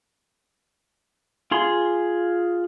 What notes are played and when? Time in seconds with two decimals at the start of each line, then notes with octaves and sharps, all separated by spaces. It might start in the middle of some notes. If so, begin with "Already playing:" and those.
1.51 F4 G#4 C6